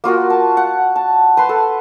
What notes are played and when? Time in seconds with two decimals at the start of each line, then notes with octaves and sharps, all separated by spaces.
0.04 A#3 F4 F#4 A#4
0.30 A5
0.57 F#5
0.96 A5
1.37 B4 A5 C6
1.49 A4